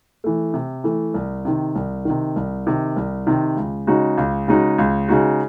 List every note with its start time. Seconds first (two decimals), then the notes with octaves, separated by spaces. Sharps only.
0.24 E3 A3
0.54 C3
0.84 E3 A3
1.14 C2
1.45 C3 D#3
1.75 C2
2.05 C3 D#3
2.36 C2
2.67 C3 D#3
2.96 C2
3.27 C3 D#3
3.57 C#2
3.87 C#3 G#3 D#4 F#4
4.18 C#2
4.48 C#3 G#3 D#4 F#4
4.78 C#2
5.08 C#3 G#3 D#4 F#4